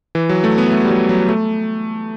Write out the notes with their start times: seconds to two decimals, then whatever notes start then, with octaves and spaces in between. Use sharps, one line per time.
0.15 E3
0.29 F#3
0.44 A3
0.58 B3
0.72 A3
0.85 G3
0.91 F#3
1.09 F#3
1.29 A3